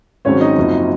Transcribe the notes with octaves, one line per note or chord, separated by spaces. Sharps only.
G#1 G#2 F#3 C4 C#4 C#5
D#4 D#5
F#1 F#2 F3 C4